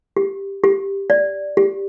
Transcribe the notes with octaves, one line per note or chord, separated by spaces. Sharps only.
G4
G4
D5
G4